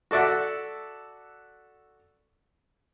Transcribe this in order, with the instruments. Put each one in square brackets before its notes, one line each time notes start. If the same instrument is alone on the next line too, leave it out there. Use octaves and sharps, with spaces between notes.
[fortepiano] F#4 A4 D5 E5 F#5